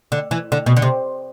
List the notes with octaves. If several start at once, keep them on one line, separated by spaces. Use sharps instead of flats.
D3
E3
D3
B2
D3
C3